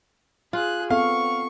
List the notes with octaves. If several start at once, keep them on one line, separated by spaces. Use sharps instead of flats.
F4 G#4 F#6
B3 C4 A4 F5 C#6